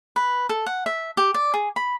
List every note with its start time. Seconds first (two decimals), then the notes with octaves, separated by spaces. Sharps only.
0.16 B4
0.49 A4
0.66 F#5
0.86 E5
1.17 G4
1.34 D5
1.54 G#4
1.76 B5